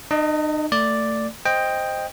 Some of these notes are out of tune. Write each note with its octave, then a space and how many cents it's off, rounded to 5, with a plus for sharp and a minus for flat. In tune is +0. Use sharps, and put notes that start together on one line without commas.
D#4 -45 D#5 +10
A3 +25 D5 +0
C5 +0 D#5 +0 G5 +10